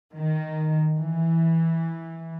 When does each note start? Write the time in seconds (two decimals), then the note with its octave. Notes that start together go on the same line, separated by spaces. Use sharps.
0.15 D#3
0.99 E3